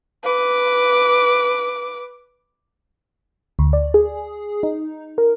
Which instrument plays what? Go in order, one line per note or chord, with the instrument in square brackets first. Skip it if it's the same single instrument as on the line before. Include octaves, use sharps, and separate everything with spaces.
[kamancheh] B4 D6
[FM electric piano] D2
D5
G#4
D#4
A#4